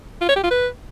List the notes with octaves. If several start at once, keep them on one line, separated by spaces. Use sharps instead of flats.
F4
C#5
G4
F4
B4